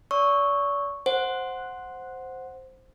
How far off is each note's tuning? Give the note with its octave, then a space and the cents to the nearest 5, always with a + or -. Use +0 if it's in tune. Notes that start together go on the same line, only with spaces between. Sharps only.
D5 -40 C#6 +0 E6 -15
C5 +0 F#5 -10